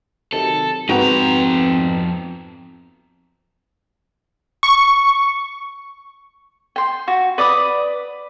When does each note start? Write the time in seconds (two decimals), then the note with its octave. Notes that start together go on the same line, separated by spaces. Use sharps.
0.33 C3 D#3 F#3 A4
0.89 F2 G#2 B3 C4 D#4 F#4 G5 A#5
4.63 C#6
6.76 G5 C6
7.08 F#4
7.38 B4 D5 B5 D#6